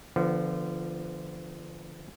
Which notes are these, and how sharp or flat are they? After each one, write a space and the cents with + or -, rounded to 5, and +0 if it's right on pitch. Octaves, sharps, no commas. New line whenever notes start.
D3 +0 F3 -25 B3 +0